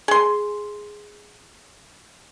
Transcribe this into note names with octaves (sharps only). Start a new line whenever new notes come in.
G#4 C6